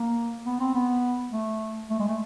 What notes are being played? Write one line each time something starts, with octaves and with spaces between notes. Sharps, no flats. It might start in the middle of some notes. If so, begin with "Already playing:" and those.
Already playing: A#3
B3
C4
B3
A3
A3
G#3
A3